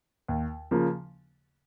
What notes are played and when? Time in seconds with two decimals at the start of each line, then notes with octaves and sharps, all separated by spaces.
0.28 D#2
0.71 C#3 F3 A#3